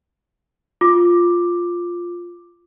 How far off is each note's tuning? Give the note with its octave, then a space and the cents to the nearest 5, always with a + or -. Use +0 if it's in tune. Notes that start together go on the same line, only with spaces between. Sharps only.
F4 +0 D6 +5